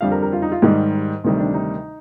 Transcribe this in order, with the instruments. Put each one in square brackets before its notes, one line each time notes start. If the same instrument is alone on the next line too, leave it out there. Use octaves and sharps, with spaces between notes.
[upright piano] F2 D3 G3 F5
A#4
A#4
F4
D#4
F4
G#2 D#3 G3 G4
D2 C3 D#3 G3
D4
D#4